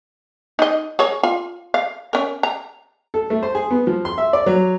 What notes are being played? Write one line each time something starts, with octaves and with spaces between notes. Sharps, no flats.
D#4 D#5
G#4 A#4 C#5
F4
F5
C#4 A#4
A#5
A4
A3
C5
G#4
B3
F3
C6
E5
D5
F#3